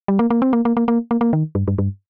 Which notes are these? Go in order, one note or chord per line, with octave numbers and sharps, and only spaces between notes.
G3
A#3
A#3
C4
A#3
A#3
A#3
A#3
A#3
A#3
D#3
G2
G2
G2